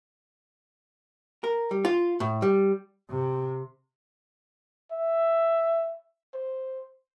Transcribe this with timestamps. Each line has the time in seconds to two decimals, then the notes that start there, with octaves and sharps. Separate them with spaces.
1.44 A#4
1.71 G3
1.85 F4
2.20 A2
2.42 G3
3.10 C3
4.92 E5
6.34 C5